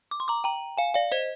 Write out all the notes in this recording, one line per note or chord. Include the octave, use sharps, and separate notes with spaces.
D6
C6
A#5 D6
G5 A#5
F5 G#5
D5 F5
C5 D#5